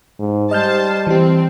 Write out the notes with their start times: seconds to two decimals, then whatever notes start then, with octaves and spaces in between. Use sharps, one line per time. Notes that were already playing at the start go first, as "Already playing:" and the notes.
0.19 G#2
0.51 G3 C5 D#5 A5 F6 G6
1.07 E3 C4 G4